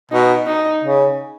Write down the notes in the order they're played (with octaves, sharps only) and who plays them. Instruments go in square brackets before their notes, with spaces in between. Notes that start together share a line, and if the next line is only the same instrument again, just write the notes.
[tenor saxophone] B2 [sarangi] D#4
[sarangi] D#4
[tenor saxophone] C#3